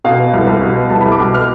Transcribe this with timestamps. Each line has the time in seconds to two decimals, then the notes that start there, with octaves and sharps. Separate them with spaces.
0.04 B2 F5
0.19 B3
0.34 C2
0.47 C2
0.61 B2
0.76 B3
0.90 C2 A5
1.01 C2 B5
1.12 D6
1.19 B2
1.34 B3 F6